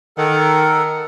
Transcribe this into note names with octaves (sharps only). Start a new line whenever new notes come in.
D#3 A4 A#4 F#5